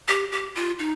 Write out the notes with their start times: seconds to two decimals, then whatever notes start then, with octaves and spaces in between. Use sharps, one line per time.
0.08 G4
0.32 G4
0.55 F4
0.79 D#4